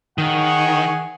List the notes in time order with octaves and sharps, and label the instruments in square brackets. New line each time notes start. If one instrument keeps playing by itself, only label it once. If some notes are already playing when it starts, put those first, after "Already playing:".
[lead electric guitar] D#3 [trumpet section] G#4 C#5 F#5